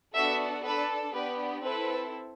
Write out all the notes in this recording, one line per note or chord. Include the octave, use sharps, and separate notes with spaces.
B3 D4 F#4 A4 E5
D4 A4 B4
B3 D4 G4 B4
C4 E4 A4 B4